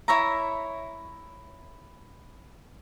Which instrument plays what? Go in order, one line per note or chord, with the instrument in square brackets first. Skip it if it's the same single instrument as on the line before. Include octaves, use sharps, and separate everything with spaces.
[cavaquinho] E4 C#5 E5 A#5